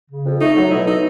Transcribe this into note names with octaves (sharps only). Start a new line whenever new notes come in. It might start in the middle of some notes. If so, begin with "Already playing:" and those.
C#3
F2
A3 D#4
F#3
B2 E4
D#4